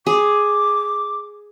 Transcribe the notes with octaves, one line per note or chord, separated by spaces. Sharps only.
G#4 D6